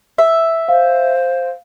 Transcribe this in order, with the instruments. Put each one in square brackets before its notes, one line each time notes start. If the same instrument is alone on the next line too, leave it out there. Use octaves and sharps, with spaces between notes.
[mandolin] E5
[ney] C5 [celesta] F5